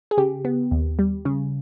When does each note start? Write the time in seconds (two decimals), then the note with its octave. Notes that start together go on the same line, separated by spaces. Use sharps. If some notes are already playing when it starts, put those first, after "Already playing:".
0.11 G#4
0.17 C#3 G4
0.45 B3
0.71 D#2
0.99 G3
1.25 C#3